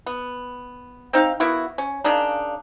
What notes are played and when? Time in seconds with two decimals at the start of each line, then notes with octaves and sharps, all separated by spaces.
0.06 B3
1.13 C4 D#4 F5
1.40 A#3 B3 E4 F#4
1.78 C#4
2.04 C#3 A#3 D4 D#4